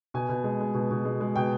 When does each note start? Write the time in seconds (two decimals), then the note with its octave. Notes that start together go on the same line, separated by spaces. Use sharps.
0.14 B2 G#5
0.29 B2
0.44 G#3
0.60 G#3
0.74 B2
0.91 B2
1.05 G#3
1.21 G#3
1.36 B2 G5